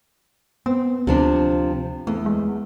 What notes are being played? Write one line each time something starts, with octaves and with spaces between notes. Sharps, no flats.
B3 C4
D2 C3 F3 D4
E2 A3
G#3